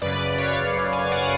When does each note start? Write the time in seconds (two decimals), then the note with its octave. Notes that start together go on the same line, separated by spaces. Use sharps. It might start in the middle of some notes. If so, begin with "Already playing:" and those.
0.02 F#2 C#3 B4 D5
0.38 C#5 F5
0.75 F#2 C#3
0.93 F5 G#5
1.12 D5 F#5